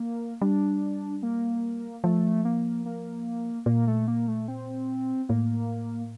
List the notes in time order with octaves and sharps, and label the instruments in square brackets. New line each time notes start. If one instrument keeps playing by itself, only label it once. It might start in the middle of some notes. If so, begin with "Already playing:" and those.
Already playing: [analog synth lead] A#3
[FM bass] G3 [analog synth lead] D4
[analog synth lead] A#3
[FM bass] F3 [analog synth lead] A3
[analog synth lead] A#3
A#3
[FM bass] A#2 [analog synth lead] A#3
[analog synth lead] A3
A#3
A3
C4
[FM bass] A2 [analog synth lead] A#3